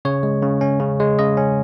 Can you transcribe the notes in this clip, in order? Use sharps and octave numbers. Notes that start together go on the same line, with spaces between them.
C#3 C#5
G#3
C#3
C#4
C#3
G#3
C#3 D#5
C#4